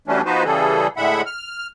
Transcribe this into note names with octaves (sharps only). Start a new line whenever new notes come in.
E3 F#3 G3 A3 C#4 D4
F3 B3 D#4 F#4 B4 C5
C#3 E3 G3 G#4 A4
A2 D3 G#3 E5 F#5 B5
F6